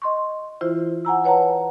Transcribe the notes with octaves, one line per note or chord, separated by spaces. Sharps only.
D#5 C6 C#6
E3 E4 F4 C5
F#5 G#5 A#5 E6
B4 C#5 F#5 A5 A#5